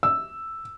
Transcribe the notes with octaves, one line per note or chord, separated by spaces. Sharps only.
E6